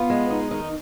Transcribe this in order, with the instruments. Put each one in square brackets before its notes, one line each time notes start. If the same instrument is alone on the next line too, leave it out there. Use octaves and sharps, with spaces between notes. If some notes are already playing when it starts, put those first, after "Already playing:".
Already playing: [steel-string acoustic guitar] B3 F4
G#3
D#4
D#3 D#4